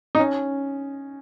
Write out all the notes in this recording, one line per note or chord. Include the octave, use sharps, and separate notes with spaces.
D#4
C#4